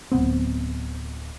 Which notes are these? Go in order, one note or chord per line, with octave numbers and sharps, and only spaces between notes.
D1 G#2 B3 C4